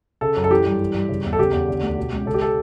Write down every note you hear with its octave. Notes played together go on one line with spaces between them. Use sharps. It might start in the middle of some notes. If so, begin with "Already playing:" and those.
C#3 A4
F#2
A4
E3 G4
G2
E3
G2
C#3
E2
A4
C#3 G4
E2
D3
D2
B2
C#2
C#3 A4
G4
A4